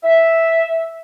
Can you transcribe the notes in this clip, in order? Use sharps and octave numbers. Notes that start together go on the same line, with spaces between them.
E5